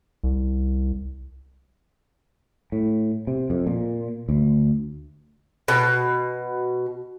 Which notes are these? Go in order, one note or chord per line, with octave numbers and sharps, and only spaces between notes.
C2
A2
C3
F2
A#2
D2
B2